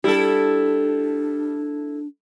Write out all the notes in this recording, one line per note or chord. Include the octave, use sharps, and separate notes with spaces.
G3 D4 E4 A4